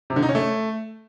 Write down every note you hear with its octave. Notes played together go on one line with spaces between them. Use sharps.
C3
D3
D#4
C#4
A3